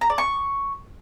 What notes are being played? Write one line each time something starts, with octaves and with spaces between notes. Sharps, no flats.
A#5
D5
C#6